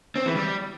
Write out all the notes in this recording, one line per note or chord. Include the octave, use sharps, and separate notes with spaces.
C4
E3
G3